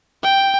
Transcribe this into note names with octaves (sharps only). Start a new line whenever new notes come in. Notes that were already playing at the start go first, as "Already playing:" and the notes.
G5